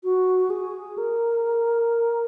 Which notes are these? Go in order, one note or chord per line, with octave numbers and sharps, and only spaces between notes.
F#4
G#4
A#4